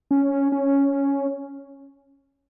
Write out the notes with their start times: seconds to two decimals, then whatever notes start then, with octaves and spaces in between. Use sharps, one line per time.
0.11 C#4
0.52 C#4